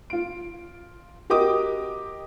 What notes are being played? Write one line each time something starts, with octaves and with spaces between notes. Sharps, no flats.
F4 D7
F#4 G4 A#4 D#5 D6 D#6